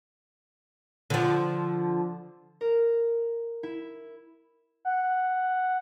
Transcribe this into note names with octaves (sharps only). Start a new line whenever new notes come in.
D3 F3
A#4
E4
F#5